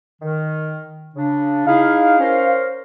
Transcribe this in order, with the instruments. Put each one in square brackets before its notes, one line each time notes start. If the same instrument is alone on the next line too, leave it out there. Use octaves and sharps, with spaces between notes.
[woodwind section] D#3
C#3 D4
[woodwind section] D#4 E4 G#4 [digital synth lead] F5
[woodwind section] C#4 A#4 C5